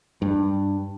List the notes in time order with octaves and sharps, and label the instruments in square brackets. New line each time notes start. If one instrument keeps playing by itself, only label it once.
[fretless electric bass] G2